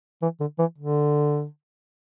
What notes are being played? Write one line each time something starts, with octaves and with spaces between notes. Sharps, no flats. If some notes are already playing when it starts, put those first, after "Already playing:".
E3
D3
E3
D3